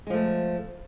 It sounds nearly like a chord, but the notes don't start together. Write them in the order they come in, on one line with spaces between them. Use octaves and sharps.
G#3 F3 A3